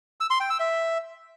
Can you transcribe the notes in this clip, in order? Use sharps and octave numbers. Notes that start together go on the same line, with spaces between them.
E6
C6
G5
E6
E5